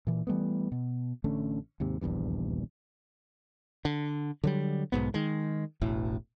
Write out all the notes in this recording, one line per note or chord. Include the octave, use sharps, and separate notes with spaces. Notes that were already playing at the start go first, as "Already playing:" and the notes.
A#2 E3
E3 G3 A3 B3
B2
A1 D3 A3 C#4
D#2 G#2 C3
D#1 A#1 E2 G2
D3
D3 F#3 G3
B1 G#2 B3
D#3 G#3
E1 A1 A2